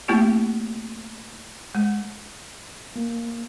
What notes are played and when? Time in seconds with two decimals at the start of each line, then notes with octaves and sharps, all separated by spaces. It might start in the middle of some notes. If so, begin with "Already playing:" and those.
0.08 A3 A#3 C4 E4 G4
1.75 G#3
2.96 A#3